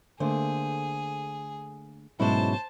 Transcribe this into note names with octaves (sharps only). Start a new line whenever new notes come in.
D3 A3 A#3 G#4 C5
G#2 B2 F#3 G#3 C#4 E4 C5 A5